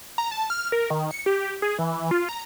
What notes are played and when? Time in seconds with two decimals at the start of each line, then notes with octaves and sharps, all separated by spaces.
0.18 A#5
0.31 A5
0.50 F6
0.72 A#4
0.90 D#3
1.11 C#7
1.26 G4
1.62 G#4
1.79 E3
2.11 F4
2.29 A#5